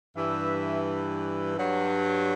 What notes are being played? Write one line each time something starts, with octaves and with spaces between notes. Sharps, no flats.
G2 E3 E5
G2 F#3